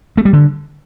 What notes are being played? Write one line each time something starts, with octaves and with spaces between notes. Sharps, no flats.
A3
G3
D3